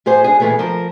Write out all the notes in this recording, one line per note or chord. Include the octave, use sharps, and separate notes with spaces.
A2 G#4 C5
D4 G#4
A#2 E3 A3 B3 G#4
F3 A#4